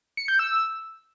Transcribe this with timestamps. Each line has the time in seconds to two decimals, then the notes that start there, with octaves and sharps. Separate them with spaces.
0.17 C#7
0.28 G6
0.39 E6